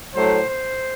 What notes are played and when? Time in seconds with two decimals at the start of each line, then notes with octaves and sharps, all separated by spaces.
0.13 A2 F#3 A3 C5
0.48 C5